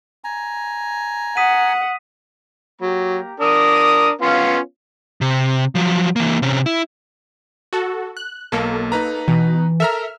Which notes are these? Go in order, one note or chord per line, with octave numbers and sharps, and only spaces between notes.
G#5 A#5
F#5 D#6 B6 D#7
F#3 A#3 G4 A#5
D4 A#4 D6 D#6
B3 C#4 F4 F5
C3
F3 F#3
E3 A#3
C3 C#4
E4
F#4 A4
F#6
B1 A#3 A4
D#4 B4 A#5
B2 E3
A4 A#4 E5 A#5 F6